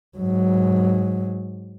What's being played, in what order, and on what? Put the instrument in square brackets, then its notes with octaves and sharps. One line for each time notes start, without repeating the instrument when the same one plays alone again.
[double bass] G#2 F#3